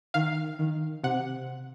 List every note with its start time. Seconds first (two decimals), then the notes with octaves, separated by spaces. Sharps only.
0.14 D#3 F5
0.59 D#3
1.03 C3 F#5